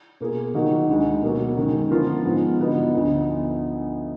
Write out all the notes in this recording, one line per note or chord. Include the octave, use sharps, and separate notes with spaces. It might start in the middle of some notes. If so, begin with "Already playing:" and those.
B2 A#3 F4 G#4
D#3 F#3 A#3 D#4 F#4
D2 D3 G#3 D#4 F#4
B2 F#3 A#3
F#2 D#3 G#3
D3 F3 B3 F4 A#4
G#2 F3 G#3 B3
D3 F#3 B3 D#4
D2 D3 F3 B3 D#4